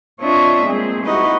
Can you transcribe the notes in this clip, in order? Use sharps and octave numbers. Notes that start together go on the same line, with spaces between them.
C4 D4 F4 C#5 D#5 E5
G#3 A#3 C4 G#4
D#4 E4 F#4 G4 B4 D#5